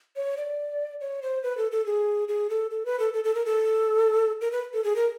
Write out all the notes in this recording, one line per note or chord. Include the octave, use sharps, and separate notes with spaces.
C#5
D5
C#5
C5
B4
A4
A4
G#4
G#4
A4
A4
B4
A4
A4
A4
A#4
A4
A#4
B4
A4
G#4
A#4